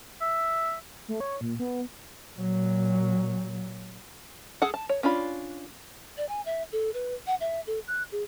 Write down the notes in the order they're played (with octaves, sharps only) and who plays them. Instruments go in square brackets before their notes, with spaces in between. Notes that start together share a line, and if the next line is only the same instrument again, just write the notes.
[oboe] E5
[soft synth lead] A3
C#5
A#2
B3
[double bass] A#2 F#3
[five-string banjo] G#4 A4 F#5
A5
C#5
C#4 D4 F4 B5
[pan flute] D5
G#5
E5
A4
B4
F#5
E5
A4
F#6
G#4